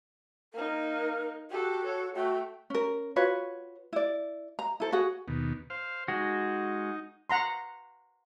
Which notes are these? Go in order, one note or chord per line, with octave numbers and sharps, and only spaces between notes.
A#3 D#4 A#4
F#4 G4 A4
A4 C#5
A3 F#4 G5
C#4 A#4
F4 F#4 B4 C#5
E4 D5
A#5
E4 A4 C5
F#4 G#4 F#5
D#2 B2
C5 F5
G#3 D#4 F#4
F#5 A#5 C6